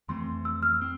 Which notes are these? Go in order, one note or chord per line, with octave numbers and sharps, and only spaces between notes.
F2 E3 A3 C4 C6
E6
F6
C4